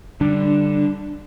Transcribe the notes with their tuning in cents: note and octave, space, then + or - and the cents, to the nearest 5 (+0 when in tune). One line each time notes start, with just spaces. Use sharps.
D3 +0 G3 +0 D4 +20